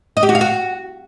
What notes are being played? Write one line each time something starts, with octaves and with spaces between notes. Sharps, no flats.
D#5
G4
F#4
F5
F#4